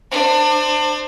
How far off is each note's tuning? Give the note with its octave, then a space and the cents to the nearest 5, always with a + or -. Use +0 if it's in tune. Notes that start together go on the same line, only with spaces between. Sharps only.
D4 +30 C5 +0